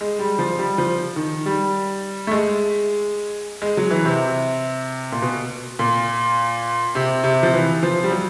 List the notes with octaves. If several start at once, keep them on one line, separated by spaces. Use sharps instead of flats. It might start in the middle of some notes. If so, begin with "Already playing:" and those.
G#3
G3
F3
G3
F3
D#3
G3
A3
G#3
G#3
F#3
E3
C3
A#2
B2
A#2
C3
C3
F3
E3
F3
G3
F#3